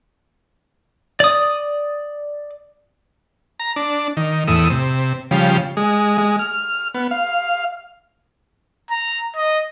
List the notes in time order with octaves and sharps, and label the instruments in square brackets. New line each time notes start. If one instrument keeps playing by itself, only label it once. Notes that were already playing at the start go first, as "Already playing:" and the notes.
[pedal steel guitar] D5 D#6
[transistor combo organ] A#5
D4
D#3
E2 A2 D#6 E6
C3
C#3 F3 G3
G#3
G#3
F6
B3
F5
[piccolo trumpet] A#5
D#5